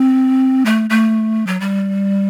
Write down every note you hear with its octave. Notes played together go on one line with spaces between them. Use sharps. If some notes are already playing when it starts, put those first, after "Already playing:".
Already playing: C4
A3
A3
F#3
G3